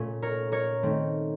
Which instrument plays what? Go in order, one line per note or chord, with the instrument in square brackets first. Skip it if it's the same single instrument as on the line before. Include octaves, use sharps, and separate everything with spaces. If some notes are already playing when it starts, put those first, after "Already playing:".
Already playing: [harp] A#2 A3 C#4
A#4 C#5
A#4 C#5
D#3 A3 C4